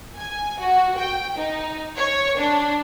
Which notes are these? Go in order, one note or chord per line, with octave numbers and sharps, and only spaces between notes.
G#5
F#4
G5
D#4
C#5
D4